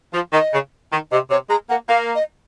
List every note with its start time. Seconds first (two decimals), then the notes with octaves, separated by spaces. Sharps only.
0.13 F3
0.33 D#3 D#5
0.53 C#3
0.91 D#3
1.11 C3 D#5
1.30 C3 C#5
1.49 G#3 A#5
1.69 A#3 F#5
1.89 A#3 F5
2.15 D#5